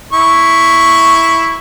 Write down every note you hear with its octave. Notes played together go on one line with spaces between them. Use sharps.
E4 C#6